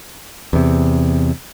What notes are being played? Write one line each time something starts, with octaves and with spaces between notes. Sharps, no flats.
E2 C3